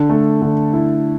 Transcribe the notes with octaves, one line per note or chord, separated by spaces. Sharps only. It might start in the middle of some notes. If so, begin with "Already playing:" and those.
Already playing: D3
A3
D3
E4